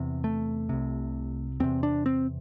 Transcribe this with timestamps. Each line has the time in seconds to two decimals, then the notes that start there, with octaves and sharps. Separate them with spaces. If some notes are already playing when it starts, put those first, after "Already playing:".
Already playing: E2 C3
0.24 A3
0.69 C2 C3
1.60 E2 C3 C4
1.83 D4
2.06 C4